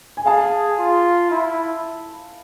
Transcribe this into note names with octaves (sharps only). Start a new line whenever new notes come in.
G#5
G#4 F5 A5
F4
E4